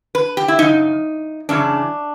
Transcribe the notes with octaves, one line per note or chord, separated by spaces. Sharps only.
B4
G4
E4
F#2 C#3 D#4
F#2 C#3 E3 D4